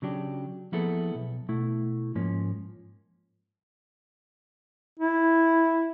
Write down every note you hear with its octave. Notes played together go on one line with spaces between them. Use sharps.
C#3 F#3 D4 G4
F3 A#3 B3 E4 G#4 A4
B1
B2 A3 E4
G#2 F3 A#3 C#4
E4